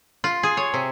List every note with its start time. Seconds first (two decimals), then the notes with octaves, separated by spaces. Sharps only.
0.24 F4
0.43 G#4
0.57 C#5
0.74 C3